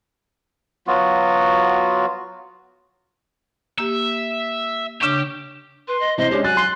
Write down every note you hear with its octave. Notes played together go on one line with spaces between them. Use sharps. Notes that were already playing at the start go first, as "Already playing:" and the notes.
F#3 B3 F4 F#4
A#3 G4 E5
C#3 D4 G4 C#6
B4 C6
D#5
C3 E3 C5 D#5
G#3 C#4 D4 G4
F#3 G#5 F#6 A6
C6